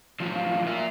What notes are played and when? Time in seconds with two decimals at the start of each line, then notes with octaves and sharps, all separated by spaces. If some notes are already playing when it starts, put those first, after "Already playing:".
0.20 A2 F3 F#3
0.35 F5
0.67 A#3 F4 E5